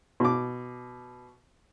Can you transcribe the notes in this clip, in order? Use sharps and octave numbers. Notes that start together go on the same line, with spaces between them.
B2 D6